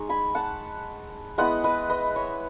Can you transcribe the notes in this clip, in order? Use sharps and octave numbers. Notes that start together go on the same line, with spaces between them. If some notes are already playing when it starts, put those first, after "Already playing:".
Already playing: G#3 D#4 C#6
G#5 B5
F#5 A5
G#3 B3 E4 D#5 F#5
B4 D#5
B4 D#5
C#5 E5